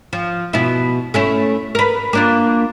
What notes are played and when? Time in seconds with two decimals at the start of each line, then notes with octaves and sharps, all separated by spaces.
0.13 F3
0.53 B2 E4
1.14 A3 C#4 E4
1.75 A#4 B4
2.13 A#3 D4 F4